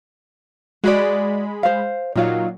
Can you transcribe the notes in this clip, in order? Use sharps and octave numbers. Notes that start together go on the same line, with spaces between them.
G#3 F#4 D5 B5
C5 F5
A#2 F#3 D#4 F4 F5